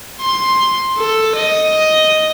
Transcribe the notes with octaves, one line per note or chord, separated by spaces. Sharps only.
C6
A4
D#5